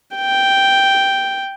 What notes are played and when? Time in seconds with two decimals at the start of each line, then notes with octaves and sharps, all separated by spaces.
0.16 G5